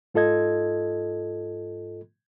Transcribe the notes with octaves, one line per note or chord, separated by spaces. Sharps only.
G#2 F4 A4 D#5 G#6